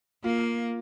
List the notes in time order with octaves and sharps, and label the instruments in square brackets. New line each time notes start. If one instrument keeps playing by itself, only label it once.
[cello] A#3 [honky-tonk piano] F4